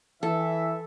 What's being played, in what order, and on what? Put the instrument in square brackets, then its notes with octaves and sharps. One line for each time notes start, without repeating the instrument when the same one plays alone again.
[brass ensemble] E3 [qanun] A4 [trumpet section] E5